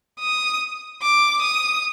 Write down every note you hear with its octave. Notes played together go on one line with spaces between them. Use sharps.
D#6
D6
D#6